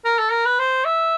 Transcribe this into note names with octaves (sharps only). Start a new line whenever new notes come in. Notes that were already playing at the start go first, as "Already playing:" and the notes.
A#4
A4
A#4
B4
C5
E5